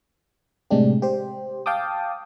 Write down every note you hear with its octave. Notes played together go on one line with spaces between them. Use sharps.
A2 C3 G#3 D4 G4
G4 C5
F5 G5 A5 D6 D#6